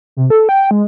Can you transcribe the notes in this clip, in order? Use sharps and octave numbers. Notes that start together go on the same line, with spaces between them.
C3
A4
G5
G#3